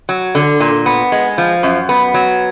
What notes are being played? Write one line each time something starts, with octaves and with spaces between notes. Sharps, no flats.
F#3
D3
A#2
B3
G#3
F3
F#2
B3
F#3